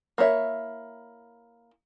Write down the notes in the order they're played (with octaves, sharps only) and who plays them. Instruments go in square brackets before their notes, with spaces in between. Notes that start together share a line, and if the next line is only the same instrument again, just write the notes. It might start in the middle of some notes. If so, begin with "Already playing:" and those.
[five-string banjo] A#3 E4 C#5 E5